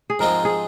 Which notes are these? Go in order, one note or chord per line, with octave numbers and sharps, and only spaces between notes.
G#4
G#2 F3 G#3 C4 F4 A#4
G#4